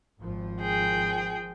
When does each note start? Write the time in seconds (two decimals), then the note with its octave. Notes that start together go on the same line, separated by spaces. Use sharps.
0.18 G#1 F3
0.59 G#4 G5